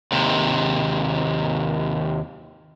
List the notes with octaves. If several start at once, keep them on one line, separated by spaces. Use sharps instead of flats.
D#2 C3